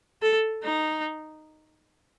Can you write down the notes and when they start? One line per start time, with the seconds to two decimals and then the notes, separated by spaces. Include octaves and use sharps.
0.22 A4
0.65 D#4